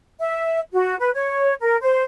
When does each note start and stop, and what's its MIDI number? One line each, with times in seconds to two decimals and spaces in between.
0.20 0.59 76
0.73 0.96 66
0.99 1.10 71
1.14 1.54 73
1.61 1.76 70
1.82 2.03 72